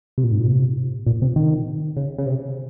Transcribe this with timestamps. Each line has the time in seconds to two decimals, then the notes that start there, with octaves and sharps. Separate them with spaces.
0.18 C3
0.24 A#2
0.32 G#2
0.39 A#2
0.47 C3
1.06 A#2
1.22 C3
1.36 D#3
1.97 C#3
2.18 C#3
2.26 C3